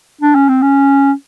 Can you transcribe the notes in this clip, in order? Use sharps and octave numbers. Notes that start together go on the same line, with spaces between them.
D4
C#4
C4
C#4